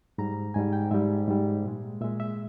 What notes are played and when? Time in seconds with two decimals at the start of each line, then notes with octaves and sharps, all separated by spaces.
0.18 G#2 G3 A#5
0.54 G#2 G3 G#5
0.73 G5
0.91 G#2 G3 E5
1.28 G#2 G3
1.65 A#2 G#3
2.01 A#2 G#3 E5
2.20 E5